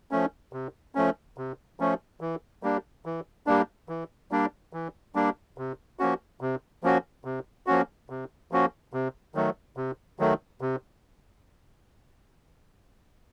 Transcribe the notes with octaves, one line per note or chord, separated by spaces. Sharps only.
F3 A3 C#4
C3
F3 A3 C#4
C3
F3 A3 C#4
E3
G3 A#3 D4
E3
G3 A#3 D4
E3
G3 A#3 D4
E3
G3 A#3 D4
C3
F3 A#3 C#4 F#4
C3
F3 A#3 C#4 F#4
C3
F3 A#3 C#4 F#4
C3
F3 A#3 C#4 F#4
C3
D#3 F#3 A3
C3
D#3 F#3 A3
C3